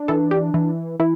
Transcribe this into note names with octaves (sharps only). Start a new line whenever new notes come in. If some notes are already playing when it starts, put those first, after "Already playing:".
Already playing: D4
E3 A4
G4
E3
E3 E4